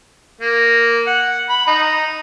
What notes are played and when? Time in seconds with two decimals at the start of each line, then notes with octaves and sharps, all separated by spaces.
0.41 A#3
1.07 F#5
1.49 B5
1.67 D#4